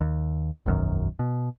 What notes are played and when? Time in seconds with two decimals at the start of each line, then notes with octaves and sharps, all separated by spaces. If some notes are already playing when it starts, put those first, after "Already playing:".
0.01 D#2
0.66 E1 B1 F#2 D#3
1.19 B2